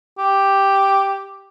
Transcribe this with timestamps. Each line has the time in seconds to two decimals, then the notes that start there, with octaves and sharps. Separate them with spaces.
0.19 G4